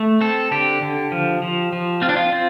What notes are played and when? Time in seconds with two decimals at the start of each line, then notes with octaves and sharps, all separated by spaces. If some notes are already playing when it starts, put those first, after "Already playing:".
Already playing: A3
0.21 C4 A4
0.51 D3 G4
0.82 D3
1.12 F3
1.42 F3
1.73 F3
2.02 C4 F4
2.09 D4
2.17 F4
2.32 C4